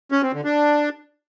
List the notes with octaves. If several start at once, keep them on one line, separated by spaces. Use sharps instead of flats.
C#4
C4
D3
D4